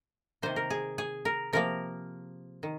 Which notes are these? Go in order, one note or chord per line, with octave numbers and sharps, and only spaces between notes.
C3 D#3 A#3 C5
A#4
G#4
G#4
A#4
C3 F3 A#3 A#4
D#3